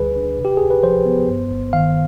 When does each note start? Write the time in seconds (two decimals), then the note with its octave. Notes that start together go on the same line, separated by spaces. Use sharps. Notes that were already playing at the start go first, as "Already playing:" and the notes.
Already playing: D2 D3 G3 G#4 B4
0.16 D4
0.39 C3
0.45 G4
0.57 D2 G#4
0.70 B4
0.83 F3 C5
1.06 B3
1.29 G2
1.51 G1
1.73 D#3 F5